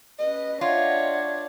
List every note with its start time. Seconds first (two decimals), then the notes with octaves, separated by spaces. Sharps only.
0.18 C#4 B4 D#5
0.61 D4 F4 C#5 D#5 E5 F#5